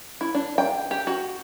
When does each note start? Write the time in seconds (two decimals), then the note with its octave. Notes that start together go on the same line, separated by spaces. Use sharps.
0.21 E4
0.35 D4
0.58 G5
0.91 G4
1.07 F#4